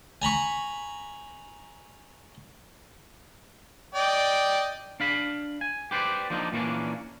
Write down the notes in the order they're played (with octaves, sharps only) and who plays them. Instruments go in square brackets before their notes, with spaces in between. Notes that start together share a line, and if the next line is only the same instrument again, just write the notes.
[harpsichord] G#5 A#5 B5 C#6
[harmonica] D5 D#5 G5
[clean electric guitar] D4 F5 B5
G#5
G4 B4 C5 D5
F3 A#3 D4 D#4 F4
A#2 E3 A#3 C#4 D4